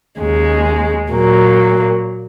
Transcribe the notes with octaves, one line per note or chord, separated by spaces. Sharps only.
D#2 C#3 G#3
A#2 F#3 A#3